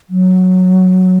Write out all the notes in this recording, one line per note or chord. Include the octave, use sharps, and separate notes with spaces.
F#3